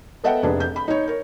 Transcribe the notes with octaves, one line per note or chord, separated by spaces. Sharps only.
B3 A4 D#5 E5 F#5 G5
F1 D4 G#4 B4
G6
B5
D#4 C#5
A#4 C#5